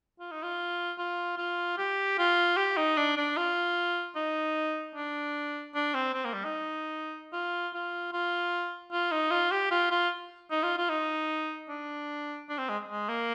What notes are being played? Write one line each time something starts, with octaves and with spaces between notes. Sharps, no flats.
F4
D#4
F4
F4
F4
G4
F4
G4
D#4
D4
D4
F4
D#4
D4
D4
C4
C4
A#3
G3
D#4
F4
F4
F4
F4
D#4
F4
G4
F4
F4
D#4
F4
F4
D#4
D4
D4
C4
G#3
G#3
A#3